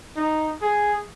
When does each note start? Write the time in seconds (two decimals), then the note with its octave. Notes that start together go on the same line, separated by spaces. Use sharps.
0.16 D#4
0.62 G#4